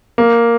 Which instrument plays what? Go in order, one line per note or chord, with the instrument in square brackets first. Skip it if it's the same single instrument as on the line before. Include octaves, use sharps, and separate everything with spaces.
[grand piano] A#3